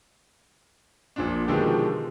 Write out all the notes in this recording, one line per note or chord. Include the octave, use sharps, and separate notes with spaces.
A#1 A#2 D4
B2 D3 D#3 F3 G#3 G4